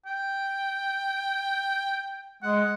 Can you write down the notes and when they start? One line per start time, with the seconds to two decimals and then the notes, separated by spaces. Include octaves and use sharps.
0.06 G5
2.43 G#3 F#5